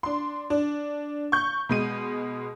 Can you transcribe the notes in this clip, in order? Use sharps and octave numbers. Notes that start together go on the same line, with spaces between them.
D4 C6
D4
C#6 G6
B2 G#3 D#7